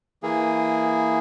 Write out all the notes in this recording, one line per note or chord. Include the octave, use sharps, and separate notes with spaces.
E3 A#3 G#4